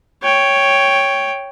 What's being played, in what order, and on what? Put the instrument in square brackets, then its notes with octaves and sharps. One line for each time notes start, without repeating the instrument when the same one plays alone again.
[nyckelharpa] C#5 G5